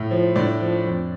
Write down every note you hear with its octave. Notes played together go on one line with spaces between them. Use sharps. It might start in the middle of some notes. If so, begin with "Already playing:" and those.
Already playing: A2
F3
A2 D4 D5
F3
F2